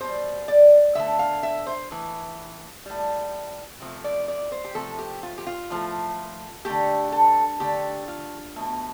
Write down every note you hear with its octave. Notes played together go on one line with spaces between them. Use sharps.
B2 G3 C5
D5
D3 A3 E5
F5
E5
C5
A2 E3
A2 G3
C3 F3 A3
D5
D5
C5
G4
C3 F3 A3 A4
G4
F4
G4
F4
A2 F3 A3
D3 A3 G4
A4
D3 A3 G4
F4
B2 A3